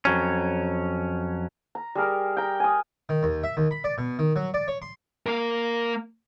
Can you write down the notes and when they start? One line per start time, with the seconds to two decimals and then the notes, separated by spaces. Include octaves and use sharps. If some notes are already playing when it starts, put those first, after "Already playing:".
0.05 F2 F#3 C#4
1.75 A#5
1.95 G3 G#4 A#4
2.37 G5 A#5
2.60 G#5 D#6
3.09 D#3
3.23 D#2
3.44 E5
3.57 D#2
3.71 B5
3.84 D5
3.98 B2
4.19 D#3
4.36 F#3
4.54 D5
4.68 C#5
4.82 C6
5.26 A#3 A#4